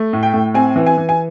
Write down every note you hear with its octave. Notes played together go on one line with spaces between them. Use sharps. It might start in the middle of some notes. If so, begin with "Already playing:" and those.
Already playing: A3
A2
G5
A2
C4 G#5
E3
G#5
E3
G#5